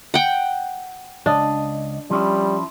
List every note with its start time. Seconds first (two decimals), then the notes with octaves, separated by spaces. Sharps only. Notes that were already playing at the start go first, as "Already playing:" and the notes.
0.14 F#5 G5
1.26 C#2 D4 D#5
2.10 F3 G3 C#4 E4